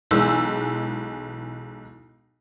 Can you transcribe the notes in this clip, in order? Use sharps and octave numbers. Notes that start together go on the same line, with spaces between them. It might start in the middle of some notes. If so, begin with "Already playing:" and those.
B1 E3 G#3 E6